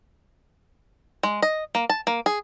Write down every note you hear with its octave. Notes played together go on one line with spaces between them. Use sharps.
G#3
D#5
A#3
A5
A#3
G#4